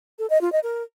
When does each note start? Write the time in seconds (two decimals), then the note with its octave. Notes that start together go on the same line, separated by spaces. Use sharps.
0.19 A4
0.30 D#5
0.41 F4
0.52 D#5
0.63 A#4